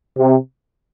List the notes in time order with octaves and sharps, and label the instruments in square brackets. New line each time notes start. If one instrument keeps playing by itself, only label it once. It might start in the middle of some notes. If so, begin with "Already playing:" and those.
[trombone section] C3